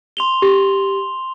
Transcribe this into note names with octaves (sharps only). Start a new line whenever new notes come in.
C6 F7 G7
G4